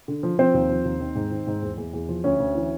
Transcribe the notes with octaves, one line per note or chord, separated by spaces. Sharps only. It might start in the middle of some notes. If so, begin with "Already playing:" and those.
D3
F3
F3 C4 C5
D#2
F3
D#2
D#3
G#2
D#3
G#2
E2
E2
E2
F3
D2 C#4 C#5
D2
E3